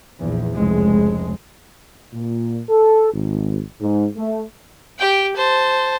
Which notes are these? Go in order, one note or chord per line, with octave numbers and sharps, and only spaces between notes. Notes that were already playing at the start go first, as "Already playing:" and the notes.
A#1 E2
F1 C#2 G#3
A#2
A4
G#1
G#2
A3
G4 G5
C5 A5